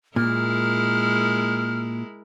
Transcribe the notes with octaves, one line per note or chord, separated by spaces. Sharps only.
A#2 G#3 E4 A#4 F6